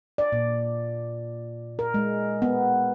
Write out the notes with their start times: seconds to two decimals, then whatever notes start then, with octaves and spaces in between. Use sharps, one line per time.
0.18 D5
0.32 A#2
1.79 A#4
1.94 G#3
2.42 B3